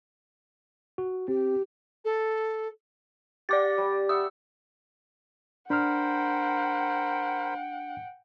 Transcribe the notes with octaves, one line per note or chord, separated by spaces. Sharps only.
F#4
C4 G4
A4
G4 D5 F#5 G5 D6 A6
G3
E5 F#5 D#6
D4 A#4 C5 F#5 G5 B5 F6